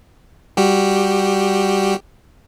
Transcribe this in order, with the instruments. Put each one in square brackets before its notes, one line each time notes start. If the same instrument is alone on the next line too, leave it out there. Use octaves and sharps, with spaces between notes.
[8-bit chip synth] G3 F#4 G4